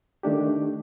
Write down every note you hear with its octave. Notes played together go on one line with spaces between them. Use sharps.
D#3 A3 D4 G4